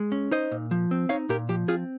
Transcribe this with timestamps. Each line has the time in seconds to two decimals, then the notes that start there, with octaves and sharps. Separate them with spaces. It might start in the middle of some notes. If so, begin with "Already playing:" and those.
Already playing: G#3
0.12 C#4
0.31 D#4 C5 D#5
0.51 A#2
0.71 F3
0.91 C4
1.09 D#4 C#5 F5
1.29 A#2 G4 A#4
1.49 F3 G4
1.68 C4 F4 G#4